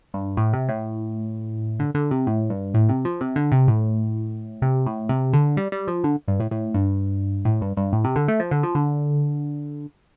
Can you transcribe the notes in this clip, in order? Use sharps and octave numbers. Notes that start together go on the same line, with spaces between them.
G2
A2
C3
A2
D3
D3
C3
A2
G2
A2
C3
F3
C3
D3
C3
A2
C3
A2
C3
D3
G3
G3
F3
D3
G2
A2
A2
G2
A2
G2
G2
A2
C3
D3
A3
F3
D3
F3
D3